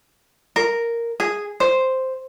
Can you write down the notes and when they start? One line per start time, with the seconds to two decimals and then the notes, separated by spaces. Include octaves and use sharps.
0.56 A#4
1.20 G#4
1.60 C5